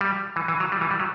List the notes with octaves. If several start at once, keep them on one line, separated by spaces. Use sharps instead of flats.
G3
E3
E3
F#3
G3
E3
G3
F#3